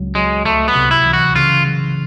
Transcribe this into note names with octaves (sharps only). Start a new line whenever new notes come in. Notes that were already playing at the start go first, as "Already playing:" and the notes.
Already playing: C#2 F#3
F#3 G#3
C2 A3
B3
C3
E4
E3
F#4
C#3 F4
F#3